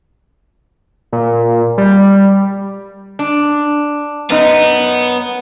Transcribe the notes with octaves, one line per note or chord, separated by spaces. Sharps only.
A#2
G3
D4
F#2 B3 D#4